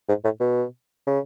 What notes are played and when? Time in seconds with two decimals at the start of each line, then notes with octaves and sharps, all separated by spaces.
0.09 G#2
0.24 A2
0.40 B2
1.07 C#3